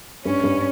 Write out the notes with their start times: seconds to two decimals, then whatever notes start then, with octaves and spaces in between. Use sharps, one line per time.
0.25 G2 C#4
0.44 G2